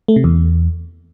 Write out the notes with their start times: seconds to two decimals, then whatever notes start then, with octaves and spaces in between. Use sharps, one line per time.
0.08 A3
0.16 C3
0.24 E2